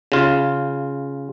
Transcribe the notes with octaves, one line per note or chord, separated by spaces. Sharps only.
C#3 F4